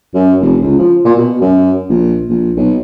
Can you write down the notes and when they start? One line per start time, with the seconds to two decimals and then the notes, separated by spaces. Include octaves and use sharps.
0.14 F#2
0.41 F1
0.62 C#2
0.78 F3
1.05 A#2
1.18 B2
1.41 F#2
1.90 A#1
2.29 A#1
2.57 B1